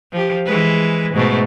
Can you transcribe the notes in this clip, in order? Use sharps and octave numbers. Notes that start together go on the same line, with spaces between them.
F3 G4
E3 G#3 B4
G#2 B2 A3